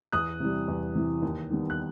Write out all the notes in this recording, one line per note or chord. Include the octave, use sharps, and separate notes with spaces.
E2 D#6 F#6
C3 E3 G3
E2
C3 E3 G3
D#2
D#3 G3 B3
F#6